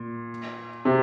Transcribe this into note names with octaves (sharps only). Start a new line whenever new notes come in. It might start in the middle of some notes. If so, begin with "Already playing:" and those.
Already playing: A#2
C3